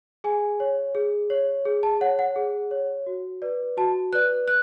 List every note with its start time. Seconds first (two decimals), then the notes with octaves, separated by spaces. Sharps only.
0.24 G#4 G#5
0.60 C#5
0.95 G#4
1.30 C#5
1.65 G#4
1.83 A5
2.01 C#5 F#5
2.19 F#5
2.36 G#4
2.71 C#5
3.06 F#4
3.42 B4 D5
3.77 F#4 A5
4.13 B4 D5 F#6
4.48 F#6